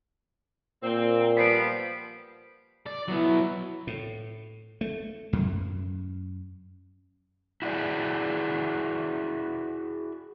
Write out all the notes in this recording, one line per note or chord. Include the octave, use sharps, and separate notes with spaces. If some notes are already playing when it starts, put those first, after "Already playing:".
A#2 A#3 C4
F3 G3 B3 B6 C7 D7
D5
F#3 B3 E4
A2
A3
F#2
E4 F#4 G#4 D5